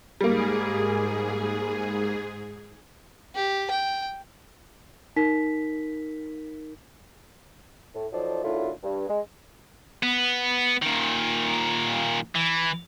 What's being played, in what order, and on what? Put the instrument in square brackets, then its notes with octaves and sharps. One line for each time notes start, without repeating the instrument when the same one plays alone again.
[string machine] G#2 G#4 [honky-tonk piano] G3 A#3
[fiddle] G4
G5
[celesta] D#4 A#4 B6
[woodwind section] A2
F3 F#3 D#4 A4 C5 D5
F#2 A2 D3 F#3 E4 F4
G2
G#3
[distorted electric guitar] B3
A#2 D#3
E3